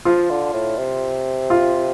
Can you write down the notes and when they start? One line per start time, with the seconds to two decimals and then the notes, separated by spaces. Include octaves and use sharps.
0.05 F3 F4
0.30 D3
0.54 A2
0.78 C3
1.50 F4